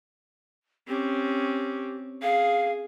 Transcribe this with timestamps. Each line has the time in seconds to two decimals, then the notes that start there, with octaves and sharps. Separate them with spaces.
0.88 C4 C#4 G4
2.22 G#4 F5